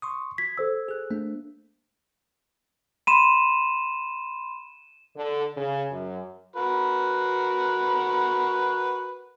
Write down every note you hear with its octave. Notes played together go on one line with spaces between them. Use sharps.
C6 C#6 D#6
G#6 B6
A4 C5 E6
G#4 F#6
A3 A#3 D4
B5 C6 D#7 E7
D3
C#3
F#2
F#4 A#4 B4